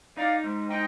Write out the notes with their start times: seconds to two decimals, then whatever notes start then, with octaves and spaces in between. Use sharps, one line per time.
0.17 D#4 D5 F5
0.44 G#2
0.70 D#4 D#5 G5